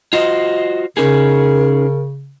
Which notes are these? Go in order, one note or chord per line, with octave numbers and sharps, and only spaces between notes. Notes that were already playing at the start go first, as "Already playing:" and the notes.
F4 F#4 C5 D#5
C#3 C#4 D#4 G#4 A#4